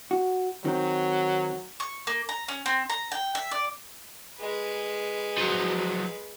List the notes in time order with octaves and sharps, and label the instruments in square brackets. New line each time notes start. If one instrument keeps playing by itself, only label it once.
[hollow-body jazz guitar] F#4
[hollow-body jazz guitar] D#3 C4 [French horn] F#3
[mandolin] C#6
A#3
A#5
C#4
C4
A#5
G5
E5
D5
[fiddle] G#3 B4
[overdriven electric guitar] F3 F#3